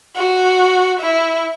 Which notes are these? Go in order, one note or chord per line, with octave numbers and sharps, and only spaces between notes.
F#4
E4